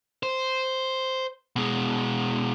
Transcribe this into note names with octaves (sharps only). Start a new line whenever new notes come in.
C5
B2 G#3